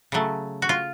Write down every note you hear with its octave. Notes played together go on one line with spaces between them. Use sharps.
C#3 F#3 A3
F#4
F4